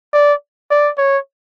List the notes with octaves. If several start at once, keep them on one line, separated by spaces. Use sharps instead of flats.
D5
D5
C#5